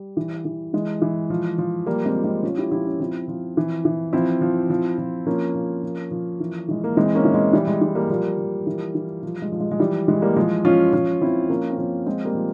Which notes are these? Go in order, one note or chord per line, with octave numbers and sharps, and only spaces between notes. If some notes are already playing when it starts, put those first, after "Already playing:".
Already playing: G3
E3
E3
E3 G#3
E3
F3
F3
F3 G3 A#3
G#3 C4
F3
G#3 C4
F3 C#4 F4
E4 G4
F3 E4 G4
C#4 F4
F3 C4 E4
F3
E3
E3
F3 C4 E4
F3
F3
F3
F3 A#3 C#4
F3
F3
F3
E3
E3 G#3
A#3
E3 G#3 C4
A#3 C#4
E3
G#3
E3 G3
G#3
E3 G#3
G3 A#3
F3 G3 A#3
F3
E3
E3
F3 G3
G#3
F3
G#3
G#3
E3 G3
E3 G#3
G3 A#3
F3 G#3
F3 C#4 F4
F3 C#4 F4
F3 C4 E4
F3 A#3 C#4
C4
F3 A#3 C#4
F3 G#3 C4
G3 A#3
F3